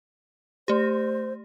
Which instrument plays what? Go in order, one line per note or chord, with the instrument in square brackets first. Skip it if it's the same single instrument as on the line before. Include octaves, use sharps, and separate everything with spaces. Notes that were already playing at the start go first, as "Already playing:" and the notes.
[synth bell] A3 G4 [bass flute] C5